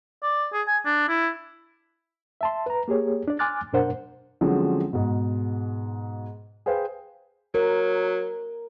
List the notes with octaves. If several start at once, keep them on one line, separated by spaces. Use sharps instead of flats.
D5
G#4
G#5
D4
E4
E5 A5 C6
B4 A#5
A#3 G4 G#4 C#5
D4 D5
G#5 C6 D6 F6 F#6 A6
F#2 B2 D4 A#4 C5 F#5
D3 F3 F#3 G#3 C4 C#4
G#2 B2
G#4 B4 C5 F5 G5
F#3 A#4